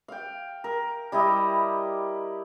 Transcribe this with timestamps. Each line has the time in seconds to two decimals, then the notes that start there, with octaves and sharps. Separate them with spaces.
0.08 F5 G5
0.64 A#4
1.12 G3 E4 G4 D#5